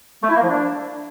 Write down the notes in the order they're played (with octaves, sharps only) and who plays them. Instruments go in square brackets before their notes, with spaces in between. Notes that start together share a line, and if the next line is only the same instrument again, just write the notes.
[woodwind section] A3
E4
A#3
F3
D4